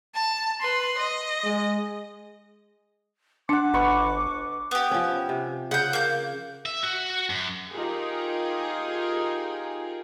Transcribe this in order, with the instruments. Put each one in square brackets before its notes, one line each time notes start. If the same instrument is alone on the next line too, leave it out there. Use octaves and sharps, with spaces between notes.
[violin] A5
B4 C6
D#5
[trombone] G#3
[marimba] D4 [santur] F#5 A5 [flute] D6
[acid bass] G1 [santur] B4 D#5 C#6
[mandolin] B3 G4
[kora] F3 C#4
C3
[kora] C#3 [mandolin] F#5 G6
[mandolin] A#3 G6
[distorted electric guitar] E5
F#4
F#2
[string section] D#4 F4 G4 G#4 A#4